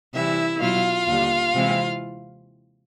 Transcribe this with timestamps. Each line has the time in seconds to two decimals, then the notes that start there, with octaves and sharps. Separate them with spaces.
0.13 C3 E3 G3 E4 E5
0.60 B2 F#3 B3 E4 F4 F5
1.08 D#2 D3 G3
1.54 C3 E3 G#3 C4 E4